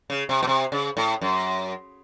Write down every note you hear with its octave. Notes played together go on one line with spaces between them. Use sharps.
C#3
C3
B2
C3
C#3
A2
F#2